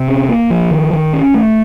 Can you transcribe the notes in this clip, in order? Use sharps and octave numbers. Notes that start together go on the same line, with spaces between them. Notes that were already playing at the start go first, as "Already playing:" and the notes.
Already playing: C3
C#4
A#3
F3
D#3
D#3
C#4
A3